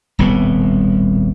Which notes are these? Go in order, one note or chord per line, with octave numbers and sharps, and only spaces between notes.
D#1 C2 A2 B3